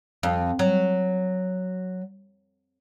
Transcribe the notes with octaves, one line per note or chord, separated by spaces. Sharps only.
F2
F#3